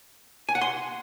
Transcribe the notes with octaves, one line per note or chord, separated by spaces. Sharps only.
G#5
F#5
C6